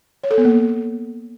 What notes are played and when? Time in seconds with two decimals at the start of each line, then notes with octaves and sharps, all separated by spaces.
0.24 C#5
0.31 A4
0.38 B3
0.45 A#3